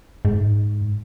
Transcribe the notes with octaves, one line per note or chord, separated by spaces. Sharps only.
G#2